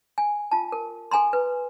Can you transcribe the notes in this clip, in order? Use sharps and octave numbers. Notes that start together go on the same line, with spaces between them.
G#5
F4 A5
A#4
A4 G#5 A#5 C6
B4